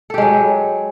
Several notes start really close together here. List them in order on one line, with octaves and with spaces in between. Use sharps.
A4 G4 G#3 F#3